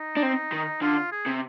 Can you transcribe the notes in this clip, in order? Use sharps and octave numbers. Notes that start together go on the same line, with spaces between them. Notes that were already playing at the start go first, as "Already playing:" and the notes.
Already playing: D#4
D4
C4
D#3
D3 F4
G#4
C3